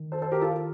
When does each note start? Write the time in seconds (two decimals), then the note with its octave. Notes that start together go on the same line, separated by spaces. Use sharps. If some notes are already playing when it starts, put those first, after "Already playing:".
Already playing: D#3
0.12 A4 C5
0.22 A4 C5
0.32 G4 A#4
0.42 F4 A4